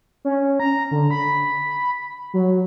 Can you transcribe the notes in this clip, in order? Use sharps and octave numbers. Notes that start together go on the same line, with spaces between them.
C#4
A#5
D3
B5
F#3